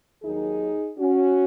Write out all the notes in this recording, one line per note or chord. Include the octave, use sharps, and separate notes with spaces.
D#2 D#3 F#3 D#4 G#4
C#4 F#4